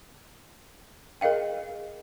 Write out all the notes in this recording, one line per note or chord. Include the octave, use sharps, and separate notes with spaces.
G#4 A#4 D#5 F5 G5